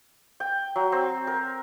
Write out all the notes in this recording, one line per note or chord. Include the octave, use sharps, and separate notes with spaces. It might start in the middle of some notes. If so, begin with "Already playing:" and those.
G5
F#3
C4
A#4